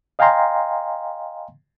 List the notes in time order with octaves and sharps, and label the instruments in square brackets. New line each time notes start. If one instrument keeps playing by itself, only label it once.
[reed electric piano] D#5 F5 G5 G#5 A#5 C6